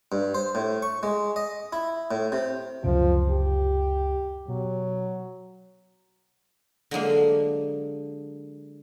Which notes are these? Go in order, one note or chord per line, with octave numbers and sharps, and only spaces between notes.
G2
C5
A2
C#6
G#3
D#5
E4
A2
C3
C#2 F#2 C3 F3
G4
B2 F#3
D3 F#3 G#3 A#3